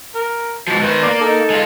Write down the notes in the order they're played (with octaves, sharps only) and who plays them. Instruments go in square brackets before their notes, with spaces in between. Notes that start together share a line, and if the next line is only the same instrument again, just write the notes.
[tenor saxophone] A#4
[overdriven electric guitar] G#2 F3 [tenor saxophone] F#4
[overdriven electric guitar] D#3 C5 [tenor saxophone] B4
[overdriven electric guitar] A#3 [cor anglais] D5
[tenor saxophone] D#4 [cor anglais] A4
[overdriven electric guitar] G#3 F4